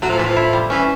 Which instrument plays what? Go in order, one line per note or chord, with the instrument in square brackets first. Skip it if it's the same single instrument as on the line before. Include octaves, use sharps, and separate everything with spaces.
[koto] A2 [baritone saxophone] F#3
[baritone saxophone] F3
[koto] A2 [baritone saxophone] E3
[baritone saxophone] F3
[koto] E4
G3
[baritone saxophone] E3 [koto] C#4